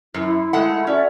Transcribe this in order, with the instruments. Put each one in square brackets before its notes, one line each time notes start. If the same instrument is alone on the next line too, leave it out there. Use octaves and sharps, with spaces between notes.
[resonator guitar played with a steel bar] F#2 [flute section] E4
[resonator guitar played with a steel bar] G#3 A3 F#5
[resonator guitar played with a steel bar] C#4 [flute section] F#4 D5 E5